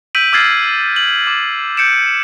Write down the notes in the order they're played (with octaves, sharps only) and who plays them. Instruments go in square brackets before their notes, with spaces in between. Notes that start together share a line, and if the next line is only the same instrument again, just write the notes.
[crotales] E6 G6 B6 D7 D#7 F#7
D6 E6 F6 G#6 A6 C7
F#7
D6
G6 C#7 D7 E7